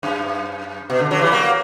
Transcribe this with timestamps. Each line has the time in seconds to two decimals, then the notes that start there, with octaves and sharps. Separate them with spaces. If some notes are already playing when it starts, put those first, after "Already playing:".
0.03 F#2
0.90 B2
1.00 D3
1.11 D3 F#3
1.21 E3 G3
1.31 F#3 A#3